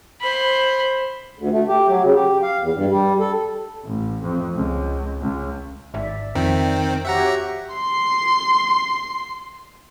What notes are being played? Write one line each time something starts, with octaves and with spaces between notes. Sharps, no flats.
C5 B5
D2
A3
G4
F#3
C#3
G4
F5
E2
G2
G3
A4
A1
F2
C#2
C#2
G#1 D5 E5
F2 D#3 C4
F#4 G4 C#5 E5 F#5 A#5
C6 C7